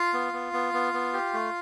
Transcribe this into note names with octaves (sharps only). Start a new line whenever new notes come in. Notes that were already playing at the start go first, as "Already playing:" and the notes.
Already playing: F4 F5
B3
B3
B3
B3
B3
G4
A3